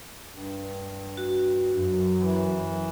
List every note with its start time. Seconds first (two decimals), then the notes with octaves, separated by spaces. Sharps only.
0.30 G2
1.17 F#4
1.73 F#2
2.19 E3